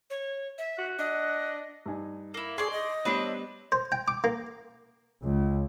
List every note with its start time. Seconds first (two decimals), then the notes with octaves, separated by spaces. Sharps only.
0.10 C#5
0.58 E5
0.78 F#4 F#5
0.99 D4 D#5
1.86 G2 D#4 G#5
2.34 A#3 E4
2.58 G#4 D5 C6 C#6 G#6
2.71 D#5
3.05 G3 B3 C4 D4 B4 C#5
3.72 C5
3.92 G5
4.08 D6
4.24 A#3
5.24 C#2